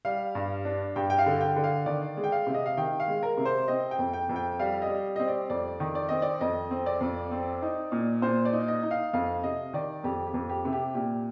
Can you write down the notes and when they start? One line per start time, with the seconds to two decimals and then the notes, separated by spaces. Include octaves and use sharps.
0.05 G3 F5
0.35 G2
0.65 D4
0.96 G2 G5
1.10 G5
1.19 F5
1.26 D3
1.41 G5
1.56 D3
1.64 F5
1.86 D#3 D5
2.17 G#3
2.24 G5
2.32 F5
2.47 C3
2.54 D#5
2.66 F5
2.77 D#3 G5
3.00 F5
3.08 G#3
3.23 A#4
3.38 C3
3.45 C5
3.68 C4 D#5
3.91 G5
3.99 F2
4.13 G5
4.29 F2
4.36 G5
4.59 G3 F5
4.82 D#5
4.89 G3
5.16 C4 D#5
5.28 D5
5.50 F2 D5
5.80 D#3
5.95 D5
6.09 C4 D#5
6.22 D5
6.41 F2 D#5
6.71 C4
6.86 D5
7.01 F2
7.32 C4
7.62 D#4
7.92 A#2
8.22 A#2 C5
8.45 D5
8.53 D#4
8.68 D#5
8.83 D#4
8.91 F5
9.13 F2 F5
9.43 C3 D#5
9.73 D#3 D5
10.04 F2 G4
10.27 G4
10.34 F2
10.49 G4
10.65 C3
10.73 G4
10.95 A#2 G4